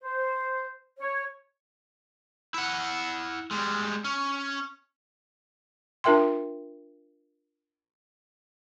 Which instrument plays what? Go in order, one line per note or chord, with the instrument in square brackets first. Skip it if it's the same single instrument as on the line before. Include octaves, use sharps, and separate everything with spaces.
[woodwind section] C5
C#5
[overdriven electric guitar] E4 F#5
G3 G#3
C#4
[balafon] D4 F4 A#4 E5 G5 C6